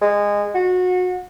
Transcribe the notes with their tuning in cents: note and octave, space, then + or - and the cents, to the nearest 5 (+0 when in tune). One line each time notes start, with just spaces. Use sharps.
G#3 -20
F#4 -25